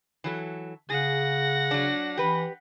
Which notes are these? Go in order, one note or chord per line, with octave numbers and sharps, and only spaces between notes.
E3 F#3 A4
C#3 G#4 F#5 A#6
F#3 D4
E3 G4 B4